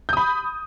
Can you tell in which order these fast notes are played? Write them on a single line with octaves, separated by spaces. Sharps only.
G6 D#6 B5